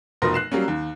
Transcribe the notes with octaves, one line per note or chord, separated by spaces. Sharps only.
F1 B2 F3 A#4 C6 A#6
F#6 C7 E7
F#3 G3 A#3 C#4
D#2